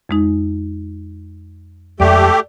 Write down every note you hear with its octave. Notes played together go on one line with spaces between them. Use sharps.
F2 G#3 D#4
F2 G#3 A3 G4 D5